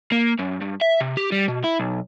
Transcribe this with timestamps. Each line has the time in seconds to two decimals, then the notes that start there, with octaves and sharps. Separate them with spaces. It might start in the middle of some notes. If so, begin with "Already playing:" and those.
0.12 A#3
0.39 F#2
0.62 G2
0.82 E5
1.00 C3
1.17 G4
1.32 G3
1.48 B2
1.64 E4
1.80 B1